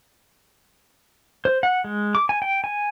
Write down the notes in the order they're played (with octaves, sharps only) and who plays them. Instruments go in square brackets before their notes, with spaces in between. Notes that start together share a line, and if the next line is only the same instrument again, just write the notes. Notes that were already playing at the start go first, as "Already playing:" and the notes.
[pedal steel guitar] C5
F#5
G#3
D6
G#5
G5
G#5